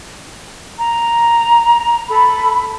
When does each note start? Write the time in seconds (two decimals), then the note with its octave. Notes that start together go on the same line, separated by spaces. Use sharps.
0.78 A#5
2.09 A4 B5